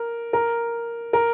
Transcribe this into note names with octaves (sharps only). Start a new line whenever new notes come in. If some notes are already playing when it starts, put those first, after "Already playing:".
Already playing: A#4
A#4
A#4